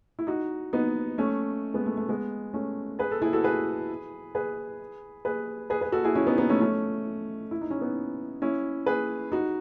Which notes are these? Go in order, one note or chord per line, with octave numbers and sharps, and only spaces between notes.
E4
D#4 F#4
B3 D#4
A3 C#4
G#3 B3
A3
A3
G#3 B3
A3 C#4
G#4 B4
A4
E4 G#4
F#4 A4
G#4 B4
G#4 B4
G#4 B4
G#4 B4
G#4 B4
F#4 A4
E4 G#4
C#4 E4
B3 D#4
B3 D#4
A3 C#4
A3 C#4
E4
D#4
C#4
B3 D#4
C#4 E4
G#4 B4
D#4 F#4